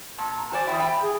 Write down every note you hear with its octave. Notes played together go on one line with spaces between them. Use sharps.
A#2 A5
A#5
F#4 C5 D5 G#5
E2 G2 E4 G5
G5 B5
G#4